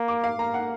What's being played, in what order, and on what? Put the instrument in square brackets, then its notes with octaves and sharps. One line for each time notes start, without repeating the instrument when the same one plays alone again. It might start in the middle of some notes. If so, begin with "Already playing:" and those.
Already playing: [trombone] A#3
[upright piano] D6
F5
[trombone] A#3 [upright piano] A#5
[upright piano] F#5